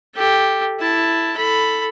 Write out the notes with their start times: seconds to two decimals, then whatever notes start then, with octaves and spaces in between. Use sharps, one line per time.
0.16 G4 A4
0.80 E4 A5
1.37 A4 B5